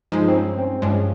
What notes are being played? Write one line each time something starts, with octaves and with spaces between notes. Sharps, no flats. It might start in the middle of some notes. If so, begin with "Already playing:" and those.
G2 F3 G#3 D#4
C4
C#4
C4
G2 F3 G#3 C#4